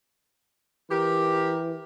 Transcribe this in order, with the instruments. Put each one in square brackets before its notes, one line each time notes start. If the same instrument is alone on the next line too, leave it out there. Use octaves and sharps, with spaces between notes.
[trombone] E3 [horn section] G4 A#4